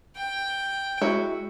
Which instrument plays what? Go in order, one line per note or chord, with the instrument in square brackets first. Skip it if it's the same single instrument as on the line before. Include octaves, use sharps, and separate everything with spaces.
[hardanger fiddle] G5
[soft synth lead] G#3 [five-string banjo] E4 F#4